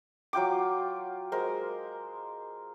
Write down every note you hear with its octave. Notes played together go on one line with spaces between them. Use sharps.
F#3 F4 G5 D6
G#3 A#4 C5